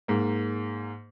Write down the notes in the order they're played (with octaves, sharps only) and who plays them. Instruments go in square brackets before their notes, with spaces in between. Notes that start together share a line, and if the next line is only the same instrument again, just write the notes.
[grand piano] G#2 A#3